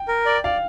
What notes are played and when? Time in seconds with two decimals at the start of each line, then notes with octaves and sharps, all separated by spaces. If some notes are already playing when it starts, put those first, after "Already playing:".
Already playing: G5
0.08 A#4
0.26 D5
0.44 D5 F5